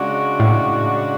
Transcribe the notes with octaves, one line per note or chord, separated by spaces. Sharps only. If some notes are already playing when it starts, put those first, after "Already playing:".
Already playing: C#3 G#3 D4 F#4
A2